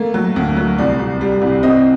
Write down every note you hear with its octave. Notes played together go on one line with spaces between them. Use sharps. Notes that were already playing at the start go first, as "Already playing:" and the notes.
Already playing: A3 A#3
F#3
D2
F#3
C2 D5
C2
G3
C2
C4 D#5